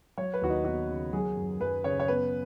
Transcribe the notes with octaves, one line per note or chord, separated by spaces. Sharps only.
F#3 C#5
B4
D#2 F#4
D#4
B3 F#4
C#3
F#3 G#4
F#2
F#2 B4
C#3 C#5
C#5
B3 B4